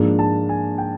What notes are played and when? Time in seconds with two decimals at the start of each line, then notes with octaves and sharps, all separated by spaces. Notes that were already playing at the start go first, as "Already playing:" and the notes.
Already playing: G#2 F3 A#3 D4
0.19 A5
0.49 G#5
0.78 G5